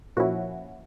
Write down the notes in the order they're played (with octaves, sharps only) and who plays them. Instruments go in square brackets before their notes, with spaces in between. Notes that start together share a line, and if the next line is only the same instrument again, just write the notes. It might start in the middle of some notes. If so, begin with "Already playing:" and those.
[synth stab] A#2 F3 A#3 C#4 E4 F#4